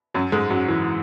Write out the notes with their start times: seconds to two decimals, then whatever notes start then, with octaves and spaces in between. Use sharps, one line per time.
0.14 F#2 F#3
0.32 G#2 G#3
0.50 F#2 F#3
0.68 E3